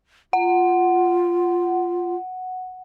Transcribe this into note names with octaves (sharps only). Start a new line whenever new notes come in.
F4 F#5